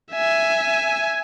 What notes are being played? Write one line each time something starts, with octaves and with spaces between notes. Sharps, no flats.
E5 G#5